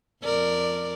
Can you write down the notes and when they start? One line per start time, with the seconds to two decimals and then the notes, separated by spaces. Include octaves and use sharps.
0.23 F2 A#4 D5